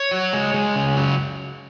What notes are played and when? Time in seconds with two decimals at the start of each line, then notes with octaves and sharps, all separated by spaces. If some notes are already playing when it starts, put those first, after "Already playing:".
Already playing: C#5
0.11 F#3
0.33 G#3
0.54 G#3
0.76 C#3
0.97 F#3